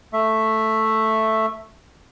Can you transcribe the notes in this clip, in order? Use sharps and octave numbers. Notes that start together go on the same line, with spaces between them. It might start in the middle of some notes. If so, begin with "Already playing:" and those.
A3 E5